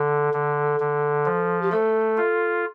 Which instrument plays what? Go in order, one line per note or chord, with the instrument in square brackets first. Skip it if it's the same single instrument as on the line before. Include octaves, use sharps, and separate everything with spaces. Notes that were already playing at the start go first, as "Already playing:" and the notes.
Already playing: [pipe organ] D3 [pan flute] A4
[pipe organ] D3
D3
F3
[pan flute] G4
[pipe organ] A3 [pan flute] A4
[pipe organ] F4